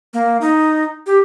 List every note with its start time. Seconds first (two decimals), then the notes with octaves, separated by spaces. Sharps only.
0.14 A#3
0.41 D#4
1.07 G4